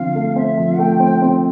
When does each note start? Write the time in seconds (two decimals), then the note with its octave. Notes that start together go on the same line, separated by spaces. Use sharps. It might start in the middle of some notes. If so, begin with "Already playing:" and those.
Already playing: D3 F3 C4 F5
0.15 A3
0.36 C4 E5
0.57 F3
0.78 A3 G5
1.00 C4
1.22 C4